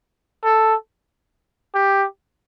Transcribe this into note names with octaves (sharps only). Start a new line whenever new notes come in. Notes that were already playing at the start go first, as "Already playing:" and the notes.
A4
G4